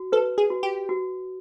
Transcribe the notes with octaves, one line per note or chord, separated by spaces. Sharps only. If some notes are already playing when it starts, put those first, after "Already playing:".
Already playing: F#4
A4 B4
G#4
F#4
G4
F#4